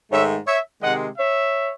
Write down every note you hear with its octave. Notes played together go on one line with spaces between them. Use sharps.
G#2 D#3 A3 C#5 E5
C#5 E5
C3 D#3 G#3 D#5 F#5
C#5 E5